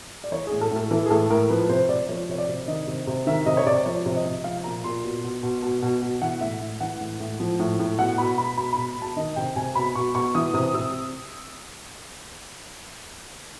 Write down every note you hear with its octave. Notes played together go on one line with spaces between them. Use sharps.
D5
E3 C#5
A2 G#4
A4
A2
A4
E3 A4
G#4
A2 A4
A2 A#4
F3 B4
C3 C5
C3 D5
F3 C#5
C3 C#5
D5
C3
D#3 D#5
C3
C3
D#3 E5
C3 D#5
C#5
C3 D5
F3 C#5
C3
D#5
C3
F3 F5
A#2 A#5
A#2 C6
B2
B2
B2
B2
B2
B2
E3 F#5
A2 E5
A2
E3 F#5
A2
A2
F3
A2
A2
B2 F#5
B2 B5
B2 B5
B2 B5
B2 B5
B2 A5
D#3 D#5
C3 G5
C3 G#5
B2 B5
B2 C#6
B2 C#6
E3 D#6
C3 D#6
C3 E6